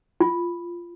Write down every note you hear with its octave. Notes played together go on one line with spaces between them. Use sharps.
F4